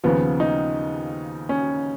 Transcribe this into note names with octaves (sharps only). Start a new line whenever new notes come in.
D#2 C#3 F3 B3
D#4
C#4